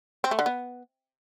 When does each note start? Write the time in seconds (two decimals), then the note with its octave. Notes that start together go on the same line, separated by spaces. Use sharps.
0.24 C4
0.31 A3
0.39 D3
0.46 B3